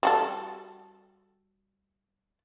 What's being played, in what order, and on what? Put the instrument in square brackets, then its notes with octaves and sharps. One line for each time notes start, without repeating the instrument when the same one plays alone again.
[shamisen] G3 F#4 A4